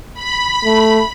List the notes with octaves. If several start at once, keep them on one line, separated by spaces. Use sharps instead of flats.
B5
A3